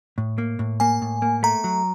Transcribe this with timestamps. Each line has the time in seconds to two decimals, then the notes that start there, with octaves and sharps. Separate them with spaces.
0.18 A2
0.38 A#3
0.59 A2
0.80 A#3 G#5
1.02 A2
1.22 A#3
1.43 A3 A#5
1.64 F#3